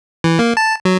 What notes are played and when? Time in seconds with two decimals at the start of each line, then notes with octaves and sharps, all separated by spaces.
0.24 E3
0.39 A#3
0.57 A5
0.85 F#3